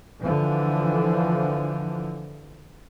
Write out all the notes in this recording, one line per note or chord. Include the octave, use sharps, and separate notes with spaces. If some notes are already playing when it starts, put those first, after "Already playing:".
D3 E3 F3